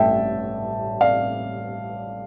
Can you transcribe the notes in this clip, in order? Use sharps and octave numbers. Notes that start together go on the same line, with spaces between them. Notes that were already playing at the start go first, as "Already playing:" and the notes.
Already playing: A1 G2 A3 E5 G5 A5
D5 F5